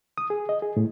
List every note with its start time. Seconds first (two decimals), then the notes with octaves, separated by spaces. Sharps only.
0.18 D#6
0.30 G#4
0.49 D#5
0.62 G#4
0.77 A2